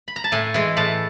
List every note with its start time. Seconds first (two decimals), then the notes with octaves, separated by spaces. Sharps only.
0.08 B5
0.16 A#5
0.24 A5
0.32 A2 G#5
0.54 E3 G#3
0.77 A2 A5